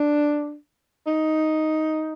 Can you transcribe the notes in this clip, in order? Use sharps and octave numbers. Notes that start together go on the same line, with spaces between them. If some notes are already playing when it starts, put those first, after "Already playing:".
Already playing: D4
D#4